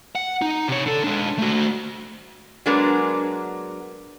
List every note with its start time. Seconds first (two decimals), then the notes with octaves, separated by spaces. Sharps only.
0.15 F#5
0.42 D#4
0.68 C3 C#5
0.86 D3 A4
1.04 G#3 D4
1.38 A3 F#4
2.66 F#3 G#3 B3 D4 A#4